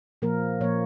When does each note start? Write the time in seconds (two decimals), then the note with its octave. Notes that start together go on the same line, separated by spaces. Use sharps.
0.22 A#2 F3 A#3 A#4
0.61 A#2 F3 A#3 C#5